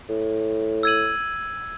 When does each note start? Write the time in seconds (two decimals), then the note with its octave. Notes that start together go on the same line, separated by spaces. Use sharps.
0.09 A2
0.83 E6 G#6 D#7 F#7